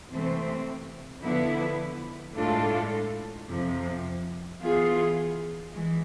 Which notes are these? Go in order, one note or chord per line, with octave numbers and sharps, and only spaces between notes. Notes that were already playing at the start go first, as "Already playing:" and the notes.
C3 E3 A3 C4
D3 F3 B3 E4 B4
A2 G#3 D4 F4 A4
F2 C3 F3
E3 B3 F4 G#4
E3 G#3